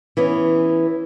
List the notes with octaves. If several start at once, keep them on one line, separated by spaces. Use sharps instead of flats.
E3 B3 C#4